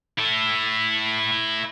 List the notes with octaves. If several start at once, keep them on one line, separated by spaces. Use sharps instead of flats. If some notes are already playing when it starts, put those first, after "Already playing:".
E4 A4